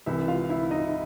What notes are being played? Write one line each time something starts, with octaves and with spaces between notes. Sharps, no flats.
C2 C3 E3 E4 E5
F4 F5
E4 E5
D#4 D#5